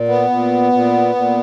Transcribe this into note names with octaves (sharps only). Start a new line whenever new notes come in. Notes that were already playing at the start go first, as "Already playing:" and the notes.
Already playing: A#2
B3
A#2
A#2
A#2